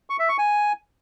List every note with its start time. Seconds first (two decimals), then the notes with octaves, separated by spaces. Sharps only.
0.10 C#6
0.19 E5
0.29 C#6
0.38 G#5